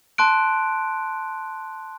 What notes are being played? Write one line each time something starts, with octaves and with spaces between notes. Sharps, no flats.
A5 C6 F#6 D7